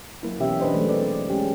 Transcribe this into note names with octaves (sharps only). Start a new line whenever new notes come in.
F#3 A#3 E4
B2 E3 C#4 G4 E5
E3 D4 B4 C5 D#5
F#3 G#3 A3
G3 C4 D5
E3 G#3 C#4 G4